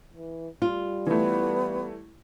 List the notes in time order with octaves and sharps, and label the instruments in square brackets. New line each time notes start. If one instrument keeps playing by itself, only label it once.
[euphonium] E3
[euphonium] G3 [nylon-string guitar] F4
[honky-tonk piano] E3 A3 [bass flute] B3